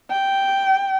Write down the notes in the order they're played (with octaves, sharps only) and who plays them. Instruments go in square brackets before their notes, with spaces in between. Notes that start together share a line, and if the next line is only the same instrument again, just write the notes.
[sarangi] G5